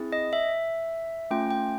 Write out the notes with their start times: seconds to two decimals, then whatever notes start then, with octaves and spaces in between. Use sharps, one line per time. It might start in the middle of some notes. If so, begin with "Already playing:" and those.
Already playing: C4 E4 G#4
0.12 D#5
0.33 E5
1.31 A3 C#4 F4 G5
1.51 G5